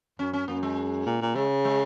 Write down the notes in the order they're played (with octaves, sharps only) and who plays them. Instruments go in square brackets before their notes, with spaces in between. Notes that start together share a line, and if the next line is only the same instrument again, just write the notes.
[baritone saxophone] F#2 [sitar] C#4
[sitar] C#4
[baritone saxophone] F#2 [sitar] A#3
[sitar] G#3
[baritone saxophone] A#2
A#2
[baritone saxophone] C#3 [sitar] G#3
[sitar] G#3